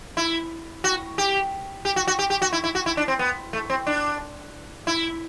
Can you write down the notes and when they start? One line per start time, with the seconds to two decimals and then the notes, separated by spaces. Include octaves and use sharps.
0.17 E4
0.84 F#4
1.18 G4
1.85 G4
1.96 F#4
2.07 F#4
2.19 G4
2.30 G4
2.42 F#4
2.53 E4
2.64 E4
2.75 F#4
2.86 E4
2.97 D4
3.08 C4
3.19 B3
3.53 A3
3.70 C4
3.87 D4
4.87 E4